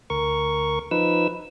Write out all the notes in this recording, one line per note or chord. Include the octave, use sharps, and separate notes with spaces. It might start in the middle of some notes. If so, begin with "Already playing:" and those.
D2 A#4 C#6
F3 D#4 B4 E6